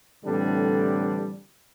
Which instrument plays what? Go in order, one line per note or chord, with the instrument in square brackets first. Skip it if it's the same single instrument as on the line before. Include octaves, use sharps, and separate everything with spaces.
[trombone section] A2 D3 E3 G3 C4 D4